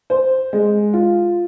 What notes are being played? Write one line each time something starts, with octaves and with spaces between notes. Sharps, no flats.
C5
G#3
F4